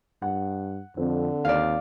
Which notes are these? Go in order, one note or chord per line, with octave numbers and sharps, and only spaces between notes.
G2 F#5
F2 D3 C4
D#2 D5 F5